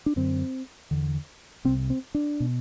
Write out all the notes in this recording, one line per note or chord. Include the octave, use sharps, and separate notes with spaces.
D4
F#2 D3 C4
E2 D3
C2 C3 C4
C4
D4
B2